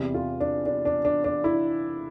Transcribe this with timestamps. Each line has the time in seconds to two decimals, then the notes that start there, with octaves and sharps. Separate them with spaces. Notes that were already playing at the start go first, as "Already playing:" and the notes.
Already playing: E2 C3 G3
0.14 F4
0.40 D4
0.66 D4
0.85 D4
1.05 D4
1.24 D4
1.44 E4